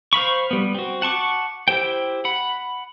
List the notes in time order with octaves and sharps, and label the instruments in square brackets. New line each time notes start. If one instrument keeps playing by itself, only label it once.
[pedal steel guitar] C5 F5 B5 C#6
G3 B3
C4 F#4
F#5 A5 C#6 D6
E4 G4 C5 G5
F#5 B5